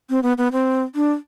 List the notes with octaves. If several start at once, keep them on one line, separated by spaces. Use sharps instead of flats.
C4
B3
B3
C4
D4